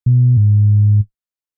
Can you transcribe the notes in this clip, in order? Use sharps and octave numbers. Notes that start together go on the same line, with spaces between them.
B2
G#2